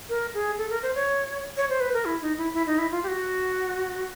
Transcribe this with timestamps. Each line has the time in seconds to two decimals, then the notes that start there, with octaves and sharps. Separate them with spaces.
0.09 A#4
0.34 G#4
0.58 A4
0.70 A#4
0.83 C5
0.95 C#5
1.57 C#5
1.69 C5
1.80 B4
1.94 A#4
2.05 E4
2.22 D#4
2.38 E4
2.54 E4
2.66 D#4
2.78 E4
2.91 F4
3.03 G4
3.08 F#4